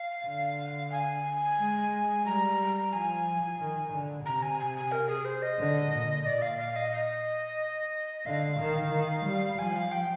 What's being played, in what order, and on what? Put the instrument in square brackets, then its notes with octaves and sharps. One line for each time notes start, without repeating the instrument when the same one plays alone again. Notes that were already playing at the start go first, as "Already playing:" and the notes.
Already playing: [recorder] F5
[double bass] D3
[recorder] G#5
[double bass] G#3
[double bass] G3 [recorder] A#5
[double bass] F3 [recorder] G#5
[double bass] D#3
D3
[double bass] C3 [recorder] A#5
[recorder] G#5
G#5
G#5
A#4
G#4
C5
D#5
[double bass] D3
A#2
[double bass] A#2 [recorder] D5
[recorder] F5
F5
D#5
D#5
[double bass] D3 [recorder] F5
[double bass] D#3
D#3
G3
[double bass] F3 [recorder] G#5
[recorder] F5
G5